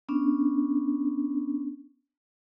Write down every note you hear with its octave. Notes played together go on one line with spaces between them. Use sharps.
B3 C#4 D4